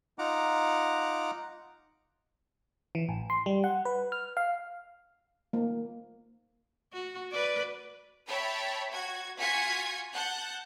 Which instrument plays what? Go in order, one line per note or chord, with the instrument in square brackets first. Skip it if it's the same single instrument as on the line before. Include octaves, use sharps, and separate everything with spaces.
[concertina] D#4 F4 F#5 A#5 D6
[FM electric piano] E3
A1
C6
G3
F#5
B4
F6
F5
[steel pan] A#3
[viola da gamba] F#4
B4 D5
[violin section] C#5 E5 G5 A5 B5
F#4 G#6
F4 F#4 G#5 G#6 B6 C#7
F#5 A5 F#6 G6